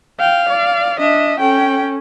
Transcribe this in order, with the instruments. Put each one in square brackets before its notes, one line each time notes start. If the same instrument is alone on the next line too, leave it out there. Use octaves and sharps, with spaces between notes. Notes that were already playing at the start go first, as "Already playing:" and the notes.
[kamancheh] F5 [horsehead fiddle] G5
[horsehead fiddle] D5
[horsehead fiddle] D4 E5 [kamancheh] D#5
[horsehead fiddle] C#4 A4 [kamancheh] G5